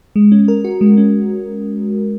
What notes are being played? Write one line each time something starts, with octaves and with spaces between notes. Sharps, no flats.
G#3
C#4
A#4
F#4
G#3
C#4